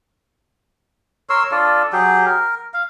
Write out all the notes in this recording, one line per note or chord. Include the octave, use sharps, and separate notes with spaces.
A#4 C#5 C6 E6
D4 F4 A4
F#3 G4 G#4
A#4
F5